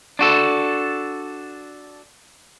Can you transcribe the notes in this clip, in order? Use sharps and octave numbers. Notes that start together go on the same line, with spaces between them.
D4 F#4 A4